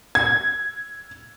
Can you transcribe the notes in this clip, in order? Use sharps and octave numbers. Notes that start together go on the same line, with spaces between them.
G#6